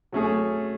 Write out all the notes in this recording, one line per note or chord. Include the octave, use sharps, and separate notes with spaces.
F#3 A3 C#4 G#4